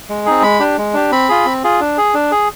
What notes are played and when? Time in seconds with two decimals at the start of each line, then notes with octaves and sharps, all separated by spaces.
0.09 G#3
0.26 C4 D#4 G#4
0.42 G#3 B5
0.60 D4 G4
0.78 G#3
0.94 D4 G4
1.12 C4 B5
1.29 F4 G#4
1.46 C4
1.64 F4 G#4
1.80 D4
1.97 G#4
2.14 D4
2.31 G#4